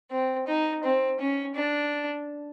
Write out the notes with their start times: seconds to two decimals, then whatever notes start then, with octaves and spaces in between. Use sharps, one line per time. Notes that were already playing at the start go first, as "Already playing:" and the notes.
0.11 C4
0.47 D#4
0.84 C4
1.20 C#4
1.56 D4